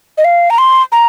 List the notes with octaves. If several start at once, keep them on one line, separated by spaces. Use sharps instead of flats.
D#5
F5
A#5
C6
A#5